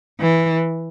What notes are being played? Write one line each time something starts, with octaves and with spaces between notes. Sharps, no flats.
E3